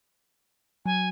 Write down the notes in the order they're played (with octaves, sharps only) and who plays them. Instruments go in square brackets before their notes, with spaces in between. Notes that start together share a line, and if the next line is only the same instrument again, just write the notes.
[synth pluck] F#3 [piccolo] G#5